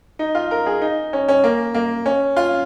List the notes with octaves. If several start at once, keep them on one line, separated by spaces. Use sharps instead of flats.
D#4
F4
A#4
G#4
D#4
C#4
C#4
A#3
A#3
C#4
F4